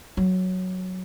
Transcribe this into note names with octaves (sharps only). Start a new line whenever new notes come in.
F#3